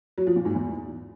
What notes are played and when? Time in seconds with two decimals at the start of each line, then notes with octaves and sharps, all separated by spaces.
0.18 F#3
0.27 F3
0.36 A#2
0.45 G#2
0.54 E2